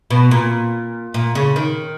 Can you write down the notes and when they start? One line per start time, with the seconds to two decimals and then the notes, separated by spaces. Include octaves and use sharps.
0.10 B2
0.31 A#2
1.14 A#2
1.35 C#3
1.56 D#3